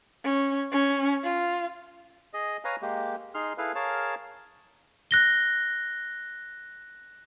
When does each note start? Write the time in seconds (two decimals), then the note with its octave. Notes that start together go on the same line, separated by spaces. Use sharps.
0.24 C#4
0.72 C#4
1.24 F4
2.34 G#4 D#5
2.64 B4 C#5 F5 G#5 A#5
2.82 G#3 A#3 G4
3.34 D#4 G#4 C6 F6
3.58 E4 G#4 A4 B4 F5
3.75 G#4 A#4 C#5 F5 A5
5.11 F#6 A#6 G7